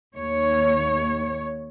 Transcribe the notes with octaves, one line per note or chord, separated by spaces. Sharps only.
D#2 C#5